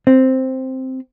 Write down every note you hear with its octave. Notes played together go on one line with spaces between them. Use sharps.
C4